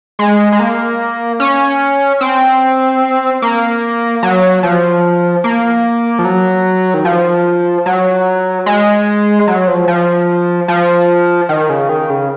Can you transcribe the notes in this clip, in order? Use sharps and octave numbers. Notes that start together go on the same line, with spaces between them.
G#3
G#3
A#3
C#4
C4
A#3
F#3
F3
A#3
F3
F#3
D#3
F3
F#3
G#3
F#3
F3
F3
F3
D#3
C#3
D#3
C#3